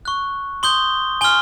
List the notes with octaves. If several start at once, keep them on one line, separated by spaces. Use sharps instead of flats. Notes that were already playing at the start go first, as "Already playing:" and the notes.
C#6 F#6
C6 D#6 G6 G7
G#5 C6 F6 G7